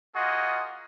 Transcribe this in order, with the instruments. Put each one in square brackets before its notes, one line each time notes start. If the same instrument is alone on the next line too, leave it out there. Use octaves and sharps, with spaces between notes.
[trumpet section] A#3 F4 F#4 G#4 D#5 F#5